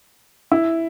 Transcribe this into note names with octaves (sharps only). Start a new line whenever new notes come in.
E4